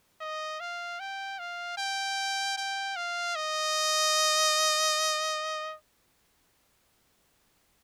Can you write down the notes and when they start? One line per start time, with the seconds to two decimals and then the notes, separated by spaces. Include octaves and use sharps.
0.21 D#5
0.60 F5
1.00 G5
1.39 F5
1.78 G5
2.57 G5
2.96 F5
3.36 D#5